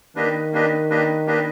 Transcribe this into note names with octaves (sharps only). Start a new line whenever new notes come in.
D#3 A#3 D4 G4 B4 D#5
A#3 D4 G4 B4 D#5
A#3 D4 G4 B4 D#5
A#3 D4 G4 B4 D#5